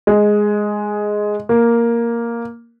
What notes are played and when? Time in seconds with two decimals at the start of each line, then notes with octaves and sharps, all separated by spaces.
0.07 G#3
1.49 A#3